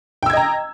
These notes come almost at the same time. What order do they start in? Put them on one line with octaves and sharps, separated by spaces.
G5 E6 G#6 D#5 A#5